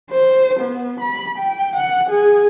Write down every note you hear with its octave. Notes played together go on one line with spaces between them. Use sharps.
C5
B3
B5
G5
F#5
G#4